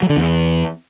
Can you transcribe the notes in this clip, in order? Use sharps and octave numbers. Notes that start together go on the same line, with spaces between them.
F#3
D3
E2